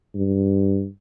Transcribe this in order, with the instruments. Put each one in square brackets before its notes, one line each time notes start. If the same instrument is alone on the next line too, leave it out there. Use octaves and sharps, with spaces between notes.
[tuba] G2